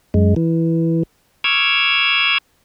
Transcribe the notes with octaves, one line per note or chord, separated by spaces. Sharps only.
F#2 G#3
E3
C#6 D6 E6 F6 G#6